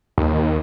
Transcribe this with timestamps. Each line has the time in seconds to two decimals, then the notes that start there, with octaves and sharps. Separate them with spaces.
0.18 D#2